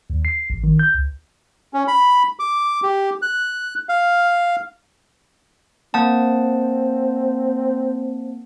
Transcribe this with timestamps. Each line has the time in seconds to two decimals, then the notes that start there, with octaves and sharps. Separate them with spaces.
0.10 D#2
0.25 C7
0.50 A1
0.64 D#3
0.79 G6
0.95 C#2
1.74 C#4
1.88 B5
2.39 D6
2.83 G4
3.22 F#6
3.89 F5
5.94 A#3 C4 F#5 A5